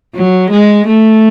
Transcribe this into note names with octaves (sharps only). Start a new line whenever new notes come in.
F#3
G#3
A3